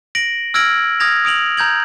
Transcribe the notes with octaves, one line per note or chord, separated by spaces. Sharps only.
A#6 D7 F#7
E6 F6 G#6 A#6 D7 F#7
D#6 F6 G#6 A#6 F7
D#6 D7 F7 F#7
A#5 G6 G#6 F#7